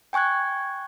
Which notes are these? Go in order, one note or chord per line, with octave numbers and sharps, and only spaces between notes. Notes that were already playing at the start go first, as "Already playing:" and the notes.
G5 G#5 C#6 F#6 G#6